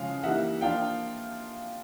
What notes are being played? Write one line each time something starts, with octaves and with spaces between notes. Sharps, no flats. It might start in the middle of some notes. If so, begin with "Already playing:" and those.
Already playing: C#3 F3 G#3 C#4 F4 F5
E3 G3 A#3 D#4 E5 F#5
F3 A#3 D4 F4 F5 G5